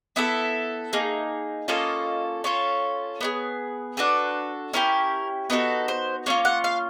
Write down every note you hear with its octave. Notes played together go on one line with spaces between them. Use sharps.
B3 E4 A4 E5
A#3 D#4 G#4
A#3 C#4 F4 A4 D#5
C#4 F4 A4 C#5
B3 D#4 G#4
D4 F#4 A4 B4
C#4 E4 G4 A#4
B3 D#4 F#4 A4 B4
C5
A#3 C#4 F4 C#5
F#5
F5